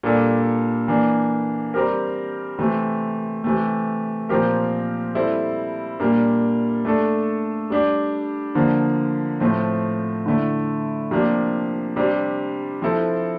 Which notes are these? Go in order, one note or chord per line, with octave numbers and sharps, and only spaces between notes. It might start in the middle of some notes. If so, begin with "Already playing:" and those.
A#2 G3 D4 A4
E3 A#3 D4
G3 C4 G4 A#4
C3 E3 A3
C3 E3 A3
A#2 F3 C4 G4 A#4
G3 C4 E4 A4
A#2 G3 A#3 D4
A3 D4 A4
G3 D4 G4
D3 F3 A#3
A2 F3 A3 C4
D3 A3 E4
C3 F3 A#3 D4
C3 G3 D4
F3 C4 E4 A4